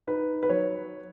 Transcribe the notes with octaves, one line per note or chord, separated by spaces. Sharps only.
D#4 B4
B4
F#3 C#5